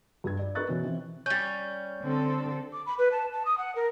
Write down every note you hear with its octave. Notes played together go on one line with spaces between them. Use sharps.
G2 G4 G#6
D5
A#4 B4 D#5 C#6 F#6 A6
B2 E3 C#4
E3 C4
G3 C#4 G6
D3 C4 A4
D6
B5
B4
A5
A5
D#6
F#5
A#4